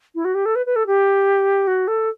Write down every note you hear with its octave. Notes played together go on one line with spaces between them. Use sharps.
E4
F#4
G4
A4
B4
B4
A4
G4
F#4
A4